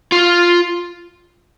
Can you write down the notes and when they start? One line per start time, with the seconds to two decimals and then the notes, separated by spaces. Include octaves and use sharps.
0.12 F4